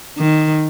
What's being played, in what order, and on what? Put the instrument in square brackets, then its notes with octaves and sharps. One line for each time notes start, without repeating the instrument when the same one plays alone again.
[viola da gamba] D#3